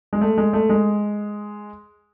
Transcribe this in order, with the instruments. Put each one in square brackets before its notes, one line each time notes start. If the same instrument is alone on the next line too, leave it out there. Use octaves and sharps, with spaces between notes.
[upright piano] G#3
A3
G#3
A3
G#3